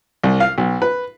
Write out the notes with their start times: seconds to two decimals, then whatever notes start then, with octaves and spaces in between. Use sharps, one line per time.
0.23 C2
0.40 F5
0.58 B1
0.82 B4